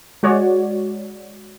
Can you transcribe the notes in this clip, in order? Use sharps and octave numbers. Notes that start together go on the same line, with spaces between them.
G#3 F#4 C#5 D5